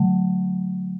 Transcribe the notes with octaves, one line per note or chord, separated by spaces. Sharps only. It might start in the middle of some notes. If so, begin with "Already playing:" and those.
Already playing: D3 F#3 A3